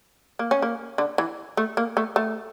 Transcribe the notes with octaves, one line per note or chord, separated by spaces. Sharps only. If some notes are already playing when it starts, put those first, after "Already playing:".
A#3
C#4
A#3
D3
E3
A3
A#3
A3
A3